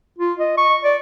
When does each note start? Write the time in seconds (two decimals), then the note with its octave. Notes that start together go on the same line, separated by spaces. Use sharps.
0.19 F4
0.39 D#5
0.57 C#6
0.84 D5